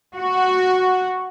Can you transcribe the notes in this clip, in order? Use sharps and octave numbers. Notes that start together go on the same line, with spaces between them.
F#4